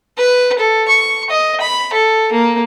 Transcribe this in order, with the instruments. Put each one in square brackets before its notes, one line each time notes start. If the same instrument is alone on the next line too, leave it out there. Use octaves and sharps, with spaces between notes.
[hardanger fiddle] B4
A4
C#6
D#5
B5
A4
A#3